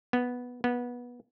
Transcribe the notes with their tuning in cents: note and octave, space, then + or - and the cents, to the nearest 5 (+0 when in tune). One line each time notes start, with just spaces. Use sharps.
B3 -5
B3 -20